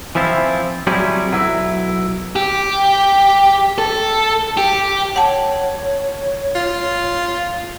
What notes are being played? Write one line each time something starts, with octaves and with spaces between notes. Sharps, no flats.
E3 F3 C4 E4 F4
F#3 G3 C4 E4 G#4
B1 F#3 E4
G4
A4
G4
C#5 F#5 A5
F4